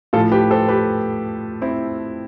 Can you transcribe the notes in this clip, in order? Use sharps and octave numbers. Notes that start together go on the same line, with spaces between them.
A2 F3 F4 A4
G4 B4
A4 C5
G4 B4
C4 E4